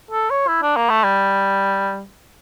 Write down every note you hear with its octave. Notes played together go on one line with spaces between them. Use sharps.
A4
C#5
E4
D4
A#3
A3
G3